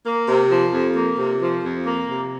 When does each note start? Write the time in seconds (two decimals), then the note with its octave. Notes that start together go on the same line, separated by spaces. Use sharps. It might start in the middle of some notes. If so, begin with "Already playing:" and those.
0.05 A#3
0.27 C3
0.49 F3
0.72 F2
0.95 A#3
1.18 C3
1.41 F3
1.62 F2
1.85 A#3
2.08 C3